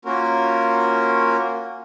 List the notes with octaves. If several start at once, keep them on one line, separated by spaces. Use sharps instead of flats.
A#3 C#4 F4 F#4 A#4